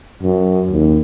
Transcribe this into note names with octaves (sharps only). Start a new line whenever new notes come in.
F#2
D#2